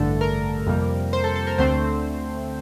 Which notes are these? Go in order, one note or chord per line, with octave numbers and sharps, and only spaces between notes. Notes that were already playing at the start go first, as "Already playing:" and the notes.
Already playing: A1 G2 D3 A3 A4
A#4
F2 C3 G3 A#3
C5
A4
A4
A#4
D2 D3 A3 C4 C5